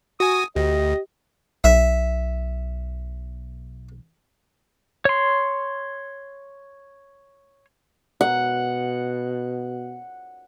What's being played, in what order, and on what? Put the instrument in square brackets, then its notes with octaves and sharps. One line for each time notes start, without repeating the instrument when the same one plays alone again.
[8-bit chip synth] F#4 G#5 [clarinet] D#6
[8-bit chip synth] D2 [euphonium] G4 [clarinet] D#5
[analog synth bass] B1 [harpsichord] E5
[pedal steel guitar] C#5 C6
[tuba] B2 [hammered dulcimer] F#5